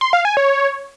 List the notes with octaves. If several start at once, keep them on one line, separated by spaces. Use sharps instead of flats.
C6
F5
G#5
C#5